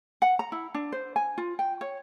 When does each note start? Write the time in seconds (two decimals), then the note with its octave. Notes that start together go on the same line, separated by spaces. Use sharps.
0.22 F#5
0.39 A#5
0.52 E4
0.74 D4
0.92 C5
1.16 G#5
1.38 F4
1.59 G5
1.81 C#5